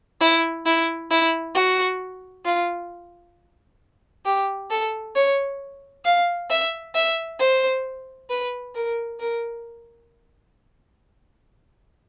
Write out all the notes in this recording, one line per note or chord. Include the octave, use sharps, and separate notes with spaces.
E4
E4
E4
F#4
F4
G4
A4
C#5
F5
E5
E5
C5
B4
A#4
A#4